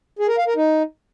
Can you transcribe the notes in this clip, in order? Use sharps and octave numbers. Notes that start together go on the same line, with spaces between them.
G#4
A#4
F5
A#4
D#4